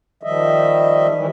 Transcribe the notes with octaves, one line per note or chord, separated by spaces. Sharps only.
D#3 F3 G3 D#5 E5
D#3 E3 G3